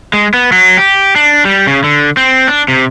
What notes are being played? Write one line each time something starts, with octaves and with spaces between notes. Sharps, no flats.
G#3
B3
F#3
G4
D4
G3
C#3
D3
C4
D4
C3